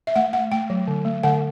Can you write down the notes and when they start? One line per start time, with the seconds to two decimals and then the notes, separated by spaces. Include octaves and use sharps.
0.07 E5
0.16 A3 F#5
0.33 A3 F#5
0.51 A3 G5
0.70 F#3
0.87 D3
1.05 A3
1.23 D3 F#5